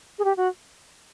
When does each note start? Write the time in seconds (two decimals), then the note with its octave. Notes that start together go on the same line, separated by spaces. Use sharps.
0.19 G#4
0.24 G4
0.37 F#4